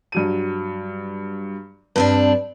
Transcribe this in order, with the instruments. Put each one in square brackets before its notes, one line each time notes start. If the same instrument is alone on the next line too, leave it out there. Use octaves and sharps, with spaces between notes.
[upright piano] G2 F#3 D#7
[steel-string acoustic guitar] G2 C4 D4 [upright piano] B4